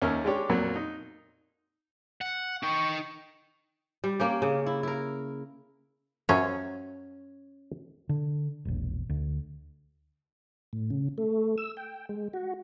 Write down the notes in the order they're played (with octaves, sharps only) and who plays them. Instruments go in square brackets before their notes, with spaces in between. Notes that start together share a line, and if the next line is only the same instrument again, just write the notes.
[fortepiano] D#2 C#4 A#4 E5
G#3 D4 G4 C#5
F2 A#2 F#3 A#3
D#4
[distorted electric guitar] F#5
[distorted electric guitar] D#4 G5 [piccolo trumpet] C#6
[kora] G3
A#3 C#4 G4
C#3
E4
E4 A#4
[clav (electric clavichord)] F#2 F3 F#3 [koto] C#4 C#5
[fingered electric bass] D3
E1 A#1
D2
[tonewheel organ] A2
C#3
A3
E6
G5
G#3
F#4